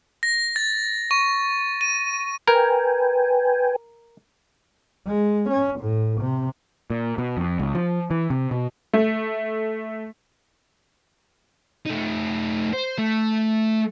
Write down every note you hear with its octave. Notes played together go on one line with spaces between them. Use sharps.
A#6
A6
C#6
D#7
A#4 B4 G5 G#5
G#3
C#4
A2
C3
A#2
B2
F2
C#2
F3
E3
C3
B2
A3
A3 D#4
C5
A3